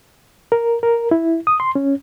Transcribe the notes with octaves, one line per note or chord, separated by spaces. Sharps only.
A#4
A#4
E4
D#6
C6
C#4